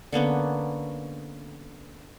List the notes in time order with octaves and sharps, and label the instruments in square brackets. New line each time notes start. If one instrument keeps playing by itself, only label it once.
[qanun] D3 A#3 B3 C#4